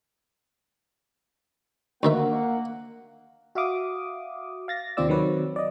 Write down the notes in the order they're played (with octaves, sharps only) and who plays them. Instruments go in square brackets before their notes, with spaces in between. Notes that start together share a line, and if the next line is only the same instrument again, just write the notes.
[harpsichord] D2 D#3 E5 [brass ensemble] A#3 F#5
[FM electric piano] F#4 E5 F5 D6 D#6
F5 A6 A#6
D#2 C3 C4 F4 D5 E6
D#3 F#3 C4 B4 C#5
D5 D#5